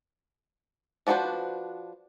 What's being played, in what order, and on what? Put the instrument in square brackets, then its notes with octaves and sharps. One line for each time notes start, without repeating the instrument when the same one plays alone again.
[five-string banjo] F3 D4 F#4 B4 C5